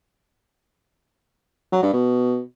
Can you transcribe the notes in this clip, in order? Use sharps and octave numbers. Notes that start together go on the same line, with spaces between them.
F#3
G2
B2